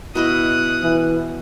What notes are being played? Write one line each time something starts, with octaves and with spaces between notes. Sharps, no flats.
B2 E4 D#5 D#6 F#6
E3